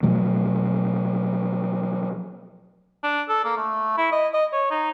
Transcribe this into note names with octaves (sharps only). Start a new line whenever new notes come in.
B2 F3 F#3 A3
D4
A4
A#3
A3
E4
D#5
D#5
C#5
D#4